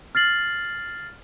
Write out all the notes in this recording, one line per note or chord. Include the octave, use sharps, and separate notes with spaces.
F6 A6 C7 F#7